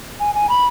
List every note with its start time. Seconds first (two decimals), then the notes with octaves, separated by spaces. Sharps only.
0.20 G#5
0.35 G#5
0.50 B5